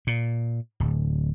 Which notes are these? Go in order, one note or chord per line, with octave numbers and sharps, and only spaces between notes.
A#2
D1